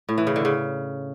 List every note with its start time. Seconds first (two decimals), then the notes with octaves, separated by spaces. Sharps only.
0.09 A2
0.18 E3
0.27 C#3
0.36 D3
0.45 C#3